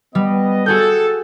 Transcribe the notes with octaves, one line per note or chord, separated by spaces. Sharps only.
G3 B3 D#5
F#4 G#4 A4 G6